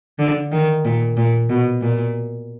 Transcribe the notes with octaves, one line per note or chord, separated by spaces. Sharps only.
D3
D#3
A#2
A#2
B2
A#2